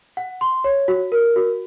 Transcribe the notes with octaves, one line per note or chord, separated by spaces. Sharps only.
F#5
C6
C#5
F#4
A#4
F#4